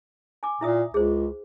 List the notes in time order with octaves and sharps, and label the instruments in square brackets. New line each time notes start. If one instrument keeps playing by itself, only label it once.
[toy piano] G#5 D6
[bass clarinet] A#2 [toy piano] E4 E5 D#6
[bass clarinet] C#2 [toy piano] G#4 C5